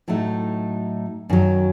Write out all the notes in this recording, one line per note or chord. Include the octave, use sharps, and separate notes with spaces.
A2 F#3 A3 D#4
F#2 D#3 F#3